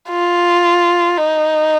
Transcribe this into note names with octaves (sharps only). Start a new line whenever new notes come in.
F4
D#4